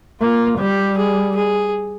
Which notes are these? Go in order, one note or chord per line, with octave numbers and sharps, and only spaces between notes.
A#3 F4
G3 G4
G#4
G#4